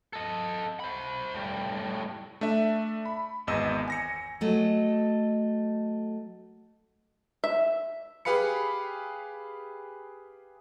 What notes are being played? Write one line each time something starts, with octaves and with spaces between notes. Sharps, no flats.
A4 D#5
C5 B5
A2 G3
A3 D4 E5
B5
G#1 E2 D#5 E6
G#5 A#6 C#7
F#3 A3 A4 D#5
E5
G4 G#4 B4 F5 B5 C#7